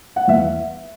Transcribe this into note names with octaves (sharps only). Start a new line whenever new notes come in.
F#5
E2 E5